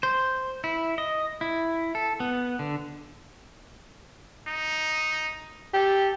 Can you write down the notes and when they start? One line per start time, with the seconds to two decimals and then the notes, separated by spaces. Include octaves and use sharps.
0.03 C5
0.64 E4
0.98 D#5
1.41 E4
1.95 A4
2.20 B3
2.59 D3
4.47 D#4
5.74 G4 A4